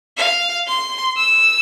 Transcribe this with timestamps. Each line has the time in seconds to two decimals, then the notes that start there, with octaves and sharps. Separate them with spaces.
0.18 F5
0.68 C6
1.17 E6